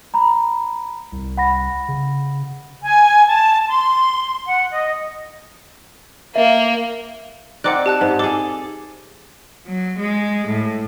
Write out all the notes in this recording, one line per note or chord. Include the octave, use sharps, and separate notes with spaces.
A#5 B5
C2
F#5 B5 A#6
C#3
G#5
A5
C6
F#5
D#5
A#3 E5
C4 D#4 D5 F#5 D6 F#6
G4 A5 F#6
G#2
G#4 A4 D6
F#3
G#3
A2